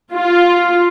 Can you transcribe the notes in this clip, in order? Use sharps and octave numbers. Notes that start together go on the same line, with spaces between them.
F4